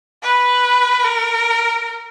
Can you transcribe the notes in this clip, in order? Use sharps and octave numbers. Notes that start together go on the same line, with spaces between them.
B4
A#4